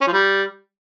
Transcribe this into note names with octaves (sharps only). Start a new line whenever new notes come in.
C#4
F3
G3